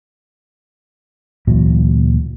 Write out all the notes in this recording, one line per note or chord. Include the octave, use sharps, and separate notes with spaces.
D2 A#2 E3 F#3